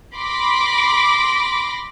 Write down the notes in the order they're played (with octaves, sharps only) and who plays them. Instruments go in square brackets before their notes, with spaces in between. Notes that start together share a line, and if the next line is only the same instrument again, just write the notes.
[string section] B5 C6 D6 A#6